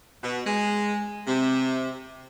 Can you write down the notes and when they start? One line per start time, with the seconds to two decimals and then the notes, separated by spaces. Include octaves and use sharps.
0.22 B2
0.46 G#3
1.26 C3